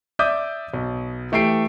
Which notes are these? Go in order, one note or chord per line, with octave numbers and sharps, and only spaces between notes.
D5 E5 D6 D#6 G6
B1
E3 A3 G4 G5 C7 D7